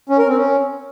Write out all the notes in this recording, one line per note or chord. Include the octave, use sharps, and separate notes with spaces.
C#4
A#4
C4
C#4